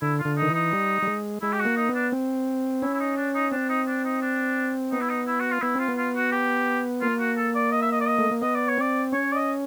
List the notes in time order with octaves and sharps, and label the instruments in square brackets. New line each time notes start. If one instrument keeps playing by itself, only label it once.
[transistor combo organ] D3 [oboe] E4
[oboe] F4
[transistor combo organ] D3
[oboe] D#4
[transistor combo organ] D#3
E3
[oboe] D#4
[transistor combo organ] G3
G3
G#3
[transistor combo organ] G#3 [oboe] E4
[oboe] G4
F#4
[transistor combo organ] A#3
[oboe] D#4
[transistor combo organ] B3
[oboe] D4
[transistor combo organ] C4
[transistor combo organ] C#4 [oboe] E4
[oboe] E4
D#4
D4
D#4
[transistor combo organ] C4 [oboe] D4
[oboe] D#4
D4
D#4
D4
[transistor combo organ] B3 [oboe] D#4
[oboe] E4
D#4
E4
F#4
F4
[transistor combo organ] B3 [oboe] E4
[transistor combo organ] C4 [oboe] F4
[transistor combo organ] B3
[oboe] F4
F#4
G4
[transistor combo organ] A#3 [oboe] F4
[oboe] F#4
A4
D5
D#5
E5
D#5
D5
D#5
[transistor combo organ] A3
A#3
[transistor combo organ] B3 [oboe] D#5
[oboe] D5
C#5
[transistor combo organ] C4 [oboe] D5
[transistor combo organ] C#4 [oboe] C#5
[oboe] D5
D#5